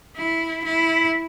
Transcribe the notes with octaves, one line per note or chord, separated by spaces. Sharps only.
E4
E4